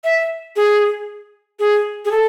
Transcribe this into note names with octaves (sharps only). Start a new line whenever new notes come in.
E5
G#4
G#4
G#4
A4